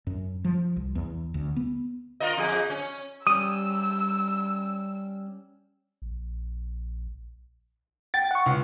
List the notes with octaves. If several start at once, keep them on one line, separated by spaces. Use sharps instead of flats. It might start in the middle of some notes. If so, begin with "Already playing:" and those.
F#2
F3
C2
E2
D2
B3
F4 A#4 D#5
F2 G#4
C#4
G3 C#4 D#6 E6 D#7
A#1
G5 A6
F#5 C#6
C#2